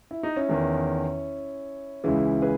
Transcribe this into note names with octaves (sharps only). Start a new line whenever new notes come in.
E4
D#4
C#4 E4
E2 D#3
C#2 C#3 E3 E4 G#4
G#4 B4